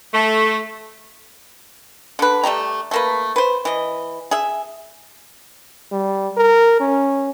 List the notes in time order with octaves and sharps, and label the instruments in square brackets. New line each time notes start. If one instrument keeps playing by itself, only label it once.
[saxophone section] A3
[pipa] D3 B4
G3 A3 G4 A#5
A3 A#3 B4
B4 C5
E3 D#5
G#4 E5
[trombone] G3
A#4
C#4